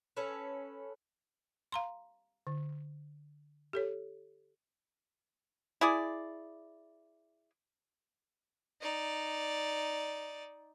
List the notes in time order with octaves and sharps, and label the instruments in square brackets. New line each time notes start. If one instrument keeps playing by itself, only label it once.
[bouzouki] C#4 A4 B4
[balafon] F5 A#5 C6
D3
G4 A4 C#5
[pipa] E4 G#4 D5
[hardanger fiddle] D#4 D5